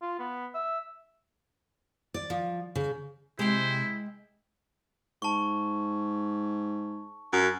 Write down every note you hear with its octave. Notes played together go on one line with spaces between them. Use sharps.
F4
B3
E5
D5
F3
C#3
C3 G#3 E4 C5 G5
G#2 A5 C#6
F#2